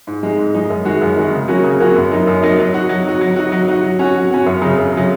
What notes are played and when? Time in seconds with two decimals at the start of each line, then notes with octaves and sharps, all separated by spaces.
0.07 G#2
0.23 G#3 D#4
0.39 G#2
0.55 G#3 D#4
0.70 F#2
0.85 D#3 G#3 F#4
1.01 F#2
1.16 D#3 G#3 F#4
1.32 C#3
1.48 F#3 A#3 C#4 F#4
1.64 C#3
1.80 F#3 A#3 C#4 F#4
1.96 F#2
2.12 F#3 A#3 D#4
2.27 F#2
2.43 F#3 A#3 D#4
2.59 F#3
2.74 D#4 F#4
2.89 F#3
3.06 D#4 F#4
3.21 F#3
3.36 D#4 F#4
3.52 F#3
3.68 D#4 F#4
3.84 F#3
3.99 C#4 F#4
4.16 F#3
4.31 C#4 F#4
4.46 F#2
4.62 C#3 F#3
4.78 F#2
4.93 C#3 F#3